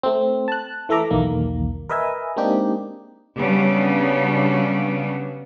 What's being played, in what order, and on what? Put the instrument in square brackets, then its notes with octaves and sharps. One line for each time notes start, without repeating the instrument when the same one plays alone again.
[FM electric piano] A3 C4
A5 F#6
E3 A3 A4 E5 A#5 D6
B1 E2 D#3 A#3
A#4 B4 D#5 E5 G#5
G#3 A#3 C4 D4 D#4 G4
[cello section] C#3 F#3 G3 B3 D4